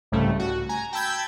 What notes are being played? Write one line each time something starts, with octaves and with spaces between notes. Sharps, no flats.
C2 G#2 C#3 G3 A3
F#4
G#5 A#5
G5 A5 B5 E6 G6 G#6